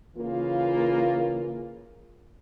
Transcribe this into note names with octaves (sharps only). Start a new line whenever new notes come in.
C#3 E3 A#3 F4